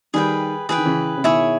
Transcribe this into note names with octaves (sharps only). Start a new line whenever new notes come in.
D#3 G3 G#4 B4 G5
E3 G#4 B4 G5
D#3
C#3 E3
C#3
B2 D#3 E4 G#4 C#5